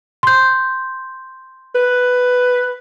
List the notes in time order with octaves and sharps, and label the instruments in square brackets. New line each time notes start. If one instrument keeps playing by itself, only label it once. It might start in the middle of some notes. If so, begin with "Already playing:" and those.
[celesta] C6 G6
[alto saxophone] B4